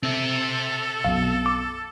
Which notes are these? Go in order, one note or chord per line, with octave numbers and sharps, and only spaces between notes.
C4 A4 E5
B1 F#2 B2 F5
D6